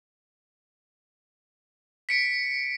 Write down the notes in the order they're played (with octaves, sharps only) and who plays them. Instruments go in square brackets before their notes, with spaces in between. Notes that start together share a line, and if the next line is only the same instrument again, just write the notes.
[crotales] B6 C#7 D7